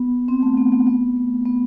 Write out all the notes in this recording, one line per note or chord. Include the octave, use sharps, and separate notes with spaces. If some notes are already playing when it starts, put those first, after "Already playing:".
Already playing: B3
C4
A3
B3
B3
B3
A3
B3